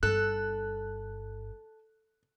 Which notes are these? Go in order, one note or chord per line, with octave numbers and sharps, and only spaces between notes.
G1 G2 A4 F#6